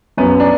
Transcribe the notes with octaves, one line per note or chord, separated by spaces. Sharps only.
F#2 B3
D4